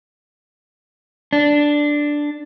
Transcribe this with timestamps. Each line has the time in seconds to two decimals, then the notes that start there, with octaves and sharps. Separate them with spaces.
1.33 D4